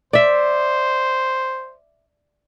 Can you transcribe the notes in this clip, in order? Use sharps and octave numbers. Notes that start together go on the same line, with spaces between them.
C5 D5 E5